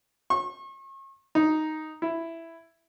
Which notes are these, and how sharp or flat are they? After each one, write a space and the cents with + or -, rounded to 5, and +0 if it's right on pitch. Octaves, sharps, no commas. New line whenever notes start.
C#6 -40
D#4 +0
E4 +5